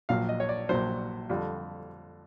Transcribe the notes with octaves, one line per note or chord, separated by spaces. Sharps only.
A#1 A#2 F#3 F5
D#5
C#5
D5
A#1 A#2 F#3 C5
F2 D3 G3